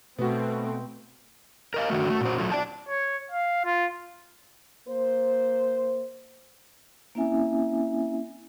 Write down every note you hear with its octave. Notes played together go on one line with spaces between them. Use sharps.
B2 A3 B3 C4 F#4
A#4 D#5 F5
F#2 D3 D#3 A3 F#4
A3
A#2 C5
F#3 A3 F4
B2 C4 E4 D5 A5
C#5
F5
F4
A#3 C5
A#3 C4 C#4 E4 E5 G#5